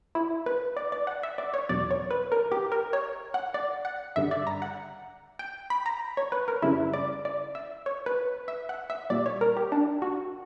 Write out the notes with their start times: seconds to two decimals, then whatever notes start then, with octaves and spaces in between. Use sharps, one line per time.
0.15 E4
0.46 B4
0.77 D5
0.92 D5
1.07 F#5
1.23 E5
1.38 D5
1.54 C#5
1.69 E2 B2 F#3 D5
1.91 C#5
2.11 B4
2.32 A#4
2.52 G4
2.72 A#4
2.93 C#5
3.34 F#5
3.54 D5
3.85 F#5
4.16 G2 D3 G3 E5
4.31 D5
4.47 A#5
4.62 F#5
5.39 G5
5.70 B5
5.86 A#5
6.17 C#5
6.32 B4
6.48 A#4
6.62 F#2 C#3 G3 E4
6.94 D5
7.25 D5
7.55 E5
7.86 C#5
8.06 B4
8.48 E5
8.69 F#5
8.90 E5
9.10 A#2 G3 D5
9.26 C#5
9.41 A#4
9.57 G4
9.72 D4
10.02 F#4